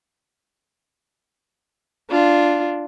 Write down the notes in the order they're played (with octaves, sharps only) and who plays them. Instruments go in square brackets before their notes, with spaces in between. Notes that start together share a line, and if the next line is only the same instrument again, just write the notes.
[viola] D4 F4